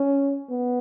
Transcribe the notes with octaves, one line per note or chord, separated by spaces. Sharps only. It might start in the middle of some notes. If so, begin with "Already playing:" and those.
Already playing: C#4
B3